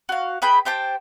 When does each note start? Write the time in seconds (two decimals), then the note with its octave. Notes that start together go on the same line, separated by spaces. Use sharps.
0.09 F#4 F5
0.42 G#4 B4 G5 B5
0.65 G4 C5 G5 A5